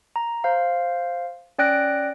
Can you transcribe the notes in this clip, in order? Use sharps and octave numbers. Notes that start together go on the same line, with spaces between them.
A#5
C5 F5
C#4 D5 G5 F#6 A#6 D7